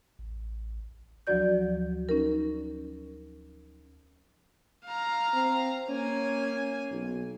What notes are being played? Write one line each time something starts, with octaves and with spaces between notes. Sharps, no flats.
A1
D2 F3 F#3 F#4 D5 G6
C#4 D#4 A#4
F5 A#5
C4
A#3 C#4 G#5
B1